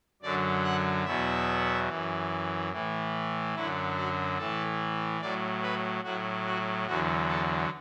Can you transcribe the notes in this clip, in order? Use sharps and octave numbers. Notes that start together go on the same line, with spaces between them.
F#2 D3 F#3 D5
F#5
E2 B2 F#3 E5
F#2 E3
A2 E3
F#2 D3 F#3 E4
F#4
A2 E3 A4
A2 F#3 D5
B4
A2 F#3 F#4
F#4
E2 D3 F#3 F#4
A4